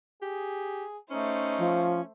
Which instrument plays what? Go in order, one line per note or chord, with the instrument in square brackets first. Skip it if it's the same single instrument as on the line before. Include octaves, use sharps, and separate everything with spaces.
[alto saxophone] G4 [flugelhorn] G#4
[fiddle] A3 C5 [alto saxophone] C#4 [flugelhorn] D#4
[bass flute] F3